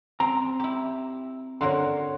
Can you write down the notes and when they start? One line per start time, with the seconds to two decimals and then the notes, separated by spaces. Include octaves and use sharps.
0.20 C4 A#5
0.60 E4 G4
1.61 D3 F#4 A#4 C#5 C6